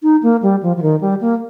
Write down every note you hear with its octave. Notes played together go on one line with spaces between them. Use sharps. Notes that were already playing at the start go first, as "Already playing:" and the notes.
D#4
A#3
G3
F3
F3
D#3
G3
A#3